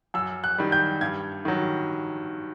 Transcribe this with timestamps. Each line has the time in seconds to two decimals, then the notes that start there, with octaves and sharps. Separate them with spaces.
0.14 F#2 E6
0.44 F#6
0.58 D#3 G3
0.72 G6
1.01 G2 G#6
1.45 D#3 F#3